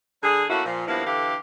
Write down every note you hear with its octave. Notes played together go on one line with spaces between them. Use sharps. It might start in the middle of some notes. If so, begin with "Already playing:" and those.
D3 G3 G#4
A3 A#3 C#4 E4 F#4
A#2 F3
G2 F3 A#3 B3 E4
D3 E3 G4 A4 F5